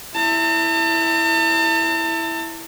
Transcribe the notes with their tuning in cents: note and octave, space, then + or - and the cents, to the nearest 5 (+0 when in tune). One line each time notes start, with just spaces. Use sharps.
E4 +0 A5 +40